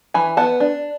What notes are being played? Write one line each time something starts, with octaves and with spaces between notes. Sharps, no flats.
E3 G#5 B5
B3 F#5 A5
D4